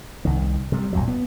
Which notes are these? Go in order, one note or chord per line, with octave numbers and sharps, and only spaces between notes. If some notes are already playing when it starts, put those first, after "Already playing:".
C2 D#3
C3 G3
A#1 F2 F#3
B3